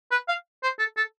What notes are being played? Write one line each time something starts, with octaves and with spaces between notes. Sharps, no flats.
B4
F5
C5
A4
A4